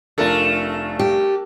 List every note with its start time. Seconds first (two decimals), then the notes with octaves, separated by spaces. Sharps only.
0.18 F1 A3 D4 F4 A4 A#4 A6
0.99 G4